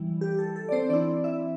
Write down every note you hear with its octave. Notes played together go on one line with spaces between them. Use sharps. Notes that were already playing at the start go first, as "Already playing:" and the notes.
Already playing: E3 G3 E4
G4
A4
A4
D5
C4 C5
E3 C4 D4 E4 D5
E4 E5